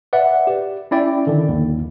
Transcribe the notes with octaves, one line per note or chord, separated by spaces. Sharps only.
B4 D5 E5 F#5
G4
C#4 E4 D5 G5
D3 D#3
G1 D#2